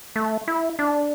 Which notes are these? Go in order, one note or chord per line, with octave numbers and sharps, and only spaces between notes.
A3
E4
D4